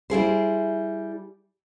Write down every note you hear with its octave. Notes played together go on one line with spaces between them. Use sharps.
G3 E4 G#4 C5